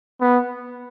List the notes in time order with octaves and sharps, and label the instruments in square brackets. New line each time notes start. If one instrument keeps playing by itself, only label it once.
[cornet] B3